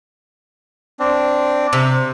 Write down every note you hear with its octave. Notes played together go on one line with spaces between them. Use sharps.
C4 D4
C3